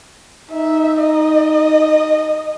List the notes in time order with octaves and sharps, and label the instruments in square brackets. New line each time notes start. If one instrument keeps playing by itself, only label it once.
[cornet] D#4 [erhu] E5
[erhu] D#5